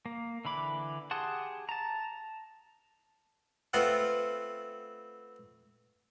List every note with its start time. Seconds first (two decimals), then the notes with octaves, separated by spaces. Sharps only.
0.06 A#3
0.45 D3 E3 B5 D6
1.11 G4 G#4 F#5 A5 C6
1.69 A5 A#5
3.73 A3 B3 C4 F4 F#5